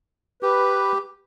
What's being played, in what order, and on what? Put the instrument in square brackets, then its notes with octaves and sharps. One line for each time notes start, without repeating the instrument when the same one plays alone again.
[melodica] G4 [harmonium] B4